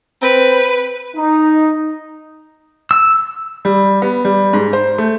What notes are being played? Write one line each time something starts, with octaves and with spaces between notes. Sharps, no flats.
C4 B4
D#4
E6
G3
B3
G3
G#2
C5
A3